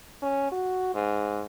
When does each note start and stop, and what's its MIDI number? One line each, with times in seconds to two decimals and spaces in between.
0.23 0.48 61
0.52 0.93 66
0.95 1.45 44